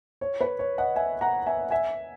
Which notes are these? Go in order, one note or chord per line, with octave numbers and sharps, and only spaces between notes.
C#5
B4
C#5
D#5 F#5
E5 G#5
F#5 A#5
E5 G#5
E5 G#5